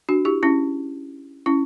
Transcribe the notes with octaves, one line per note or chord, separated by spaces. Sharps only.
D4 F#4
E4 G4
C#4 E4
C#4 E4